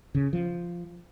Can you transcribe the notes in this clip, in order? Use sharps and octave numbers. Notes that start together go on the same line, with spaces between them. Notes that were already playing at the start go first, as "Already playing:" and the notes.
C#3
F3